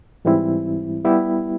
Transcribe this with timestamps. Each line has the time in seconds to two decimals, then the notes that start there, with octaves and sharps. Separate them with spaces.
0.25 G#2 E3 G3 C4 E4
1.05 G3 B3 E4 G4